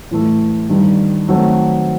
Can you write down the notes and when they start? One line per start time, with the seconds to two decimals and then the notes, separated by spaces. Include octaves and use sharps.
0.11 A2 E3 A3
0.70 G2 D#3 G3
1.28 D#3 F#3 A3 C4